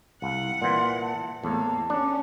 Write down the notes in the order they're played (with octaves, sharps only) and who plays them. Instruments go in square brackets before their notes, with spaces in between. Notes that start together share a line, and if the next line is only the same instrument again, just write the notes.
[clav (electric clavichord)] C2 [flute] F5 [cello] F#5
[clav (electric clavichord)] A#2 E3 [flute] C6
[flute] A5
[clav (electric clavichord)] E2 A2 [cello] A#3 [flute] A5
[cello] C#4 [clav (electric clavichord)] D4